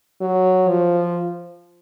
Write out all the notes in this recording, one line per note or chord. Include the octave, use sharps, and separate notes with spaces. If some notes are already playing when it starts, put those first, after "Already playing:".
F#3
F3